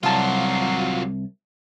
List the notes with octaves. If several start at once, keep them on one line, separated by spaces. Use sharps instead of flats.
C2 F#3 G3 F4 A5